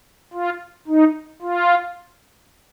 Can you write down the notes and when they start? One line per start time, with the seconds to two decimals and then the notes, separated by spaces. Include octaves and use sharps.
0.34 F4
0.88 D#4
1.42 F4